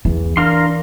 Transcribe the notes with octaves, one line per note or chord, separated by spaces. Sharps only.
E2 E3
D4 A#4 F5 C6